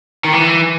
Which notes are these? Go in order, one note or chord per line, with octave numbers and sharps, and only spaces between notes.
D#3
E3